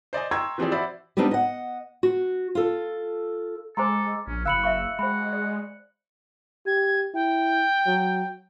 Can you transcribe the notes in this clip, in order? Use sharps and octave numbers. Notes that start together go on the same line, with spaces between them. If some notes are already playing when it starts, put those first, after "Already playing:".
C5 D5 D#5 G#5
G5 A#5 C6 C#6 E6 G#6
E3 F3 C4 G4 G#4 D5
F#4 C5 D5 E5 B5
G3 B3 C4 D4 D#4
D#5 F#5
F#4
F4 A4
G#3 A4 C5 G#5 A#5 C6 D6
A#1 C#4
F#1 F5 B5 E6 F#6 C#7 F#7
E5 F5 C#6
G#3 F#4 C5 G5 B5
D5
G4 G#6
E4 G5
F#3